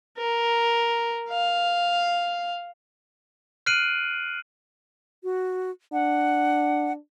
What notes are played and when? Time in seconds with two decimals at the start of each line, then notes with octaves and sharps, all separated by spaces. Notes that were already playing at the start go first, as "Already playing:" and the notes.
0.18 A#4
1.30 F5
3.66 F6 F#6 C7 D7 D#7 F#7
5.24 F#4
5.93 D4 F#5